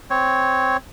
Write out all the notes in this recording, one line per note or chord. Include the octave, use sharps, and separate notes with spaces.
C4 C#5